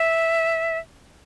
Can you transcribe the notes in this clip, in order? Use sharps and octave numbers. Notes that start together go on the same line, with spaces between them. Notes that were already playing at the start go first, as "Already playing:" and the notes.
Already playing: E5